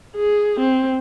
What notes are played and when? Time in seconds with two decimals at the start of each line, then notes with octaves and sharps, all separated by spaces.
0.15 G#4
0.60 C4